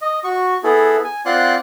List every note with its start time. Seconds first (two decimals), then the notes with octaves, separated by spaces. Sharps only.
0.01 D#5
0.24 F#4 C#6
0.64 B3 E4 G#4 A4
1.04 G#5
1.26 C4 F4 D5 F#5 C6 F#6